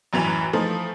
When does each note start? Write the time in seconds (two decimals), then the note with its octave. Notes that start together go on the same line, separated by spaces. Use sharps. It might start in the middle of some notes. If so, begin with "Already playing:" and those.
0.13 A1 F#2 E3 B4 F7
0.53 E3 F3 A3 D#4 F4